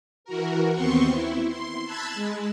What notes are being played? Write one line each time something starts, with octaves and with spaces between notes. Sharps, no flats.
E3 F#4 A#4
D#2 B3 C4 C6 C#6
E4
C6
A5 B5 E6 F#6 G#6 A6
G#3